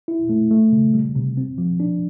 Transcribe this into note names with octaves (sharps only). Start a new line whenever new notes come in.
E4
A3
A3
C#3
G3
C3
C4
F3
D4